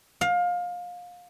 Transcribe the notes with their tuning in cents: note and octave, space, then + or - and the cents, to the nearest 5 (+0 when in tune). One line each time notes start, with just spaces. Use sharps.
F5 +25